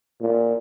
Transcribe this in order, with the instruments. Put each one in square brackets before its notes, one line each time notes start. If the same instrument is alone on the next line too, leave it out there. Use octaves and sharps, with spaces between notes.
[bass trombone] A#2